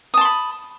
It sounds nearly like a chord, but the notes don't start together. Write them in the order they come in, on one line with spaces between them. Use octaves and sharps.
D#6 A5 C6 B5